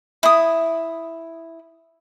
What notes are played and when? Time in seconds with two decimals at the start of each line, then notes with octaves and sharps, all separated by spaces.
0.23 E4 D#6